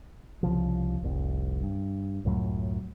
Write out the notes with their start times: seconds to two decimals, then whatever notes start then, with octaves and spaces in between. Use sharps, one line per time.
0.43 C2 C#3 F3
1.02 F1 C2
1.63 G2
2.25 C#2 F#2 A2 F#3